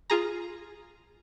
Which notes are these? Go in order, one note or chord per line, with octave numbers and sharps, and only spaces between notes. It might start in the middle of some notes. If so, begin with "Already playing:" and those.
F4 G#4 A#5